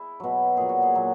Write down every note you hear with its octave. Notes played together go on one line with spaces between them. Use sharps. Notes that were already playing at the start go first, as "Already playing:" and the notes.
Already playing: E4 G#4
B2 F#3
A#2 F#3 G#4
F#4
G#4
A#2 F#3